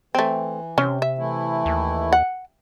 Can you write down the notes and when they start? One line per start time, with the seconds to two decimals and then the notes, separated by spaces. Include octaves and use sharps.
0.15 E3 A3 C4
0.78 C3 C#4
1.02 E5
1.18 E3 A3 E4
1.66 D#2
2.13 F#5